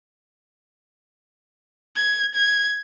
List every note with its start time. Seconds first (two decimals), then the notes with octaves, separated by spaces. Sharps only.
1.96 G#6
2.35 G#6